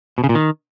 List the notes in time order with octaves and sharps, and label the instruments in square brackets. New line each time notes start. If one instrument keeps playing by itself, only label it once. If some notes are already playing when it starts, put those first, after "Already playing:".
[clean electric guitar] B2
C#3
A#2
D#3